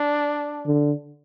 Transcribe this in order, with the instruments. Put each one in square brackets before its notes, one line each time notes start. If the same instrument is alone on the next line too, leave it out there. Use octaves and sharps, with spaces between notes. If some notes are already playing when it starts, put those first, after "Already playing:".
Already playing: [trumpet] D4
[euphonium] D3